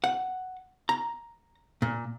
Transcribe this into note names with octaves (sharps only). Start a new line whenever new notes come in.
F#5
A#5
A#2